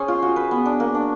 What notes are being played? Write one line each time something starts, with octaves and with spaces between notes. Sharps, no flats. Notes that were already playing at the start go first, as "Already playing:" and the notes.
Already playing: C#4 G#4 C5
F4
F#4
B4
B3
D4
A#3
D4